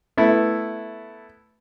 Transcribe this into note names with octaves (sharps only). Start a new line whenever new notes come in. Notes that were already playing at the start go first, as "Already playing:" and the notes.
A3 B3 E4